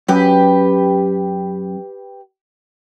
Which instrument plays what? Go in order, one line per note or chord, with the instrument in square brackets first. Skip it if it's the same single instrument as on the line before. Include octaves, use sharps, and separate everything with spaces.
[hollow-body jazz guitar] F#2 [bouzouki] G4 B4